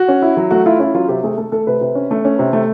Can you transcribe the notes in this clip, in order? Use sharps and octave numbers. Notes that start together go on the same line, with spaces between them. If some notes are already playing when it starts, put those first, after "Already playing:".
Already playing: F#4
C#4
E4
F#3
A3 F#4
E4 F4
C#4 E4
F#3 F4
C3 G4
A3 G#4
A3 A4
A3 A4
C3 B4
C3
C#4
A3
C#4
C3
A3